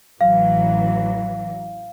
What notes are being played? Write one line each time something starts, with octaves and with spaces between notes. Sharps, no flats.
A1 E3 F#3 F5